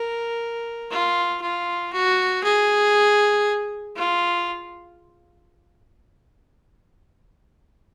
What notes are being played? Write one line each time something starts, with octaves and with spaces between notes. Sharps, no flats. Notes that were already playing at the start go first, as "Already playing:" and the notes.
Already playing: A#4
F4
F4
F#4
G#4
F4